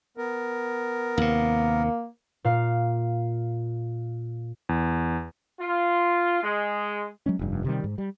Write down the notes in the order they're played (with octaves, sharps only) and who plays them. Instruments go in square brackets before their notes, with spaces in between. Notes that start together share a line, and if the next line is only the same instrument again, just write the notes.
[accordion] B3 A#4
[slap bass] D#2 C3 [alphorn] A#3
[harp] A#2 F5 F6
[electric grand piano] E2
[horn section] F4
G#3
[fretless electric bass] F#3 G#3 C#4
F1 G2
C3 D#3 G3
G#2
G3